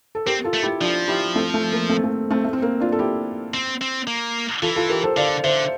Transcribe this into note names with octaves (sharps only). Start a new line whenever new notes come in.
A4
C4 G4 A#4
F4 A4
A3
E4 G4
F3 D4 F4
E4 G4
A3 C4
A3
A#3
A3 C4
A3
A3 C4
A3
C4
A#3
D4 F4
A4
E4 G4
C4
C4
A#3
E3 F4 A4
F4 A4
G4 A#4
A4 C5
D3 D5 F5
D3 C5 E5